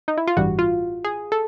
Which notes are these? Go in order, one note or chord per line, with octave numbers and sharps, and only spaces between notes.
D#4
E4
F4
A1 G2 E3 G3 F#4
F4
G#4
A4